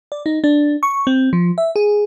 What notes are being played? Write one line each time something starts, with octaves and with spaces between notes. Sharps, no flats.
D5
D#4
D4
C#6
C4
F3
E5
G#4